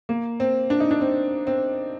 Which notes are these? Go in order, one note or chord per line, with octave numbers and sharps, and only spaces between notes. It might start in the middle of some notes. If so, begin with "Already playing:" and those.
A#3
C4
D4
D#4
D4
C4
C4